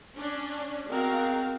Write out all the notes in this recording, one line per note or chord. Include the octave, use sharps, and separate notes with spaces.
C#4 D4
G#3 B3 C4 F#4 A#4 F5